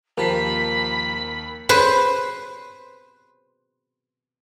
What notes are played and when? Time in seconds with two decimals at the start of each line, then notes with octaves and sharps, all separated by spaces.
0.17 D#2 F3 G4 A#4 A5 B5 C7
1.69 B4 C5